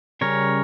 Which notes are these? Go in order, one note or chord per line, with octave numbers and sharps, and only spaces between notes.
C#3 G3 C#4 A#4 C#5